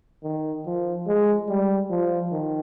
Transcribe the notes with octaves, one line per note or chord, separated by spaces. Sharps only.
D#3
F3
G#3
G3
F3
D#3